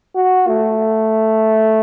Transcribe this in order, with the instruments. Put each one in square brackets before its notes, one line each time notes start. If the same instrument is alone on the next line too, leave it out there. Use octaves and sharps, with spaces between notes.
[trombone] F#4
A3